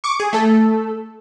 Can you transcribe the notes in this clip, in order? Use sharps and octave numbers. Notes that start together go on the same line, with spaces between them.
C#6 D6
G#4
A3 A4